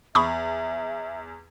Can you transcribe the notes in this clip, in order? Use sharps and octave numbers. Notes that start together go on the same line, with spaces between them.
E2 E5 B5 C#6 D#6